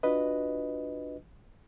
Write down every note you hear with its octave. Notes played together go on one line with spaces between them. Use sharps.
D4 F4 F#4 B4 D#5